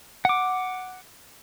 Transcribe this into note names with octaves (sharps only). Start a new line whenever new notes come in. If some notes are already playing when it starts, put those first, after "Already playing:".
F#5 D6